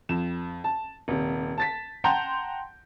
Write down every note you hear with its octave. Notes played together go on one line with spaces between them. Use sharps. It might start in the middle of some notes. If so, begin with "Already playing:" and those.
F2 E7
A5
D#1 C3
A5 A6 B6
F#5 G5 A5 A#5 C6 G6